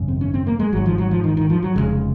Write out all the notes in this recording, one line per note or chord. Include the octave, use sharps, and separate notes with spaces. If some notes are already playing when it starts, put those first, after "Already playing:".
Already playing: G#1 F#2 C#3
C4
C#4
C4
A#3
G#3
G#1 G#2 F#3
F3
F#3
F3
D#3
D#3
F3
F#3
F1 D#2 C#3 G#3